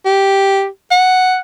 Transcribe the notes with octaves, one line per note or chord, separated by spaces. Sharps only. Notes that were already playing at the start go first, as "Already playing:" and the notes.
G4
F#5